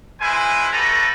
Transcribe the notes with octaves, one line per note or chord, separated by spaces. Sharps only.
G#3 E4 B4 C5 G#5
G3 A3 F#4 A4 B4 A#5